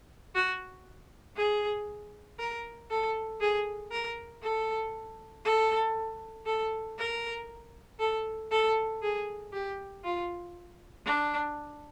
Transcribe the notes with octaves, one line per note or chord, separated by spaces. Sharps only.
F#4
G#4
A#4
A4
G#4
A#4
A4
A4
A4
A#4
A4
A4
G#4
G4
F4
D4